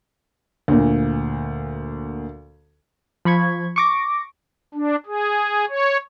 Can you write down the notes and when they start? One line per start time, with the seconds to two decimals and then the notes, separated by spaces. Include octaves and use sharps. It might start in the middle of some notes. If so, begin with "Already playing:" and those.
0.68 D2 A#2
3.25 F3 B5 C#6 G#6
3.76 C#6 D6 A#6
4.74 D4
5.06 G#4
5.69 C#5